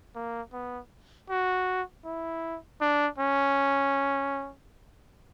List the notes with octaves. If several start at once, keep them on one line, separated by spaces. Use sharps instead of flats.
A#3
B3
F#4
E4
D4
C#4